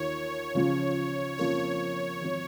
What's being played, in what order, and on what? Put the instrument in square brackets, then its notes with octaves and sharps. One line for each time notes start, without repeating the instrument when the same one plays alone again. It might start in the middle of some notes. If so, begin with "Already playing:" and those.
Already playing: [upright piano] D#2 D#3 A#3 F4 [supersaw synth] C#5
[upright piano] C#2 C#3 F3 C#4 F4
[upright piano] F2 C#3 F3 A#3 F4 [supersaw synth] C#5
[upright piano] G#1 F3